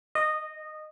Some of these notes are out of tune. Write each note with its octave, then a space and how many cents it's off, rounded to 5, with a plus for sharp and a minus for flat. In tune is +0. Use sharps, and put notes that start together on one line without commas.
D#5 -15